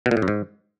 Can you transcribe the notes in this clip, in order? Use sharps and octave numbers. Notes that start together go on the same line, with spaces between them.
B2
A#2
A2
F#2
G#2